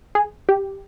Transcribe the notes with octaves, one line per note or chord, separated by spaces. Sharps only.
G#4
G4